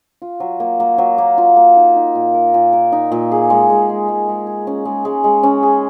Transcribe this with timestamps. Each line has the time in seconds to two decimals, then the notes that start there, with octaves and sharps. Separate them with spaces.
0.22 F4
0.40 F#3
0.60 A#3
0.80 A#3
0.98 F#3
1.18 A#3
1.38 F4
1.56 A#3
1.76 D#4
1.96 D#4
2.15 A#2
2.34 A#4
2.54 A#2
2.73 A#4
2.92 D#4
3.12 A#2
3.32 G#4
3.50 G#3
3.70 G#3
3.89 G#3
4.08 G#3
4.28 G#3
4.47 G#4
4.67 C#4
4.85 G#3
5.05 G#3
5.24 G#3
5.43 C#4
5.63 G#4